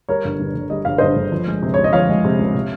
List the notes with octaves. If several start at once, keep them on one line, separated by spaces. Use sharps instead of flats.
G3 A#4 C#5
G1
G2
G1
G3 D#5
G1 F5
G2 C5 D#5
G1
F3
G#3
C3
C#5
C#2
D#5
F3 C#5 F5
G#3
C3
C#2
C3